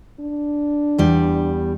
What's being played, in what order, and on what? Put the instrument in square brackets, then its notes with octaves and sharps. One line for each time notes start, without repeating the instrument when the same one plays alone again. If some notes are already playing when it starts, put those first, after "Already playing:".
[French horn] D4
[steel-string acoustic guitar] E2 G3